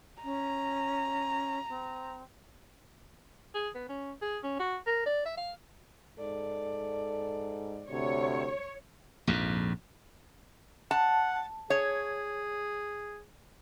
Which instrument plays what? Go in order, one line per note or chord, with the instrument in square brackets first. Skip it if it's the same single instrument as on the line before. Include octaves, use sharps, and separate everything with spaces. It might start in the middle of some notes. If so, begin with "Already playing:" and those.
[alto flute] C#4 [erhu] A#5
[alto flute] C4
[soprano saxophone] G#4
B3
C#4
G#4
C#4
F#4
A#4
D5
E5
F5
[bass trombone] G#2 [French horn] A4 [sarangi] D5
[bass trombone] D2 [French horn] C3 [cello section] C#5
[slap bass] A#1 F2 G#2
[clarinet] F#5 [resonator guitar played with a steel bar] A5
[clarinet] G#4 [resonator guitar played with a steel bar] C#5